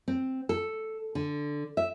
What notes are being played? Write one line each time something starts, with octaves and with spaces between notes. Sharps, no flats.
C4
A4
D3
E5